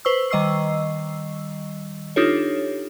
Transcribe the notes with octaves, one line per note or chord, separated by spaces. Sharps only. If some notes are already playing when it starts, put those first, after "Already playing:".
B4 C5 C#6 E6
D#3 G3 D#5 C#6 E6 C7
D4 D#4 F4 G4 A4 C#5